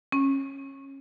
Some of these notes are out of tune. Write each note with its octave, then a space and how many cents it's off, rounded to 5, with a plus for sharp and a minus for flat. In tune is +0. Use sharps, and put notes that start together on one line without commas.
C#4 -20